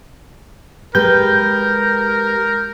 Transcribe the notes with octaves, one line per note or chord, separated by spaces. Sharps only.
G#3 G4 A#4 B4 G6